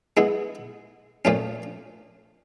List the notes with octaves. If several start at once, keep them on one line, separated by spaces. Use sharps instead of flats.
G#3 B3 E4 G#4
A#2 F3 A3 C#4